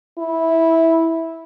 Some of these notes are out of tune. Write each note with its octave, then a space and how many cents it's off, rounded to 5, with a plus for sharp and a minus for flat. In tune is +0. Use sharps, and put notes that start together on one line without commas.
E4 -10